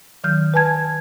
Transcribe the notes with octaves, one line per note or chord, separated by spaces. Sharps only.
D#3 F#3 F6 G6
B4 G#5 A5 G#6